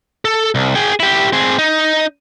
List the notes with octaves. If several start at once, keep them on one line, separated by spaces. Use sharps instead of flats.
A4
C2
G#4 G5
E4 G4
C4 G#4
D#4